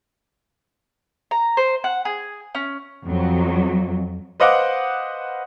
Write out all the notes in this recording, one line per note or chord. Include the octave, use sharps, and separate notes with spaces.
A#5
C5
F#5
G#4
C#4
F2 F#3
B4 C5 D#5 F5 F#5 D6